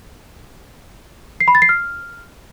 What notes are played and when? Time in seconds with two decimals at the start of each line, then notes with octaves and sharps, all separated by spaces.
1.40 C7
1.48 B5
1.55 A6
1.62 C7
1.69 F6